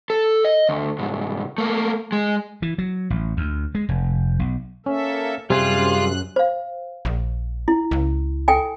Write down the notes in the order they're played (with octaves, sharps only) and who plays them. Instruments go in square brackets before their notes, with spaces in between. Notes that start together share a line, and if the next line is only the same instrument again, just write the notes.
[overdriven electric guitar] A4
D#5
D2
C2 G#2
A3 A#3
G#3
[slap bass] E3
F#3
A1
D2
G#3
F1
B1
[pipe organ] A#3 A4 E5 [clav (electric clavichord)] C#4
[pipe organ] F#2 F#6 [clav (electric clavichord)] C3 [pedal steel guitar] G3 G#4 C5 [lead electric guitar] F4
[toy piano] C5 F5
[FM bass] A#1
[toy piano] E4
[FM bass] C#2
[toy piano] A4 G5 G#5